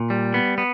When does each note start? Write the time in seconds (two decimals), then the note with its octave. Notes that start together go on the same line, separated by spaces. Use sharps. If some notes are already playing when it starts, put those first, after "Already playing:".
Already playing: A#2
0.10 G3
0.34 B3
0.58 B3